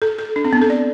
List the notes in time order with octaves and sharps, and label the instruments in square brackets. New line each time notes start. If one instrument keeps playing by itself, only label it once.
[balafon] A4
A4
D4
C4
B3
A4
D5